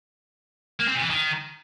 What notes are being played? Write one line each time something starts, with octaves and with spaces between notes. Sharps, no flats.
A#3
C4
A#2
E3
D#3